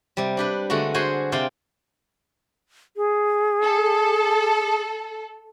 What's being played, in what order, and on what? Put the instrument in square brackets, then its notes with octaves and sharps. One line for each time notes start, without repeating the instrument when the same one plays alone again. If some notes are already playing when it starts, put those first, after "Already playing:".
[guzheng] C3 G3
D4 G4 B4
D3 G#3 A3 F#4
F#4 G#4 C5 G#5 B5
C3 C5 D5 F5 G5
[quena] G#4
[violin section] A4